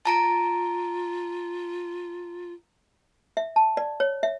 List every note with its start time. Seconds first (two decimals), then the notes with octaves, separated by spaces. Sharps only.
0.05 F4 A5 A#5 D7
3.37 E5
3.56 A5
3.77 D5
4.00 C#5
4.23 E5